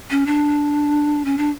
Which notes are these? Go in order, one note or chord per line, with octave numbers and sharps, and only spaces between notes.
C#4
D4
C#4
D4